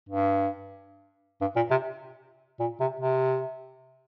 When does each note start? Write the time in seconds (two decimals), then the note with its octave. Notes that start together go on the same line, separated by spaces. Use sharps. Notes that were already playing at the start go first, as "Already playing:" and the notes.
0.09 G2
1.41 G2
1.56 A#2
1.71 C3
2.60 A#2
2.80 C3
3.00 C3